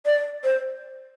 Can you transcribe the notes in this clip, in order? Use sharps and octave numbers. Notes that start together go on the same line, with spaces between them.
D5
C5